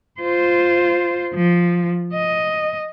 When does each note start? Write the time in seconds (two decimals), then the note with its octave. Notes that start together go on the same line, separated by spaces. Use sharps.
0.21 F4 C5
1.34 F3
2.14 D#5